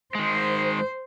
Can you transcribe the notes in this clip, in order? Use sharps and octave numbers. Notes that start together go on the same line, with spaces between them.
D#3 G#3 C5